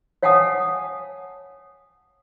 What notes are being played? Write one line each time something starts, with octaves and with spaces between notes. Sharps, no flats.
C#5 F5 F#5 G#5 A5 D#6